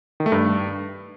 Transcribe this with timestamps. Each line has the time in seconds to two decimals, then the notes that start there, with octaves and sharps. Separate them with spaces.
0.20 D#3
0.26 A3
0.32 G2